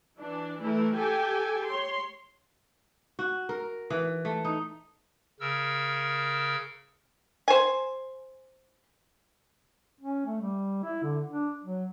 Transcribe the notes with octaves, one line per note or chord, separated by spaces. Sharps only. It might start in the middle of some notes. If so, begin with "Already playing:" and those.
E3 D4
E3 A3 E4 A#4
G4 A4 G5 G#5
C#5 C6
F#4
A#4
E3
A3
D#4
C#3 A#4 E6
C5 G#5
C#4
A3
G3
E4
D3
D4
F#3